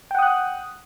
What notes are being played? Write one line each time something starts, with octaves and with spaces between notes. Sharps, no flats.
F#5 G5 D#6 F#6